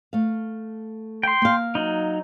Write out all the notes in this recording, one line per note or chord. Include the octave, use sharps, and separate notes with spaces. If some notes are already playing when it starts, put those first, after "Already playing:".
A3 F5
G5 C6
A#3 F5
F#3 D#4